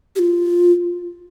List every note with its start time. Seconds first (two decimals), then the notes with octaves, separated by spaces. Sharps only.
0.16 G4
0.19 F4